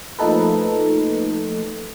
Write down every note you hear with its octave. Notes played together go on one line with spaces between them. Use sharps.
F3 A3 A#3 D#4 A4 B4